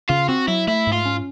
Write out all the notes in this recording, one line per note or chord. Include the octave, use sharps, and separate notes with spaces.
C#3 F4
C4 F#4
F#3 E4
A3 E4
G#2
F4
C#4